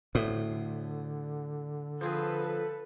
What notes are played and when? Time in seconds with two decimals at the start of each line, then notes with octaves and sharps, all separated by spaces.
0.15 D2 A2 D3 D#6
2.01 F3 C4 G#4 A4 B4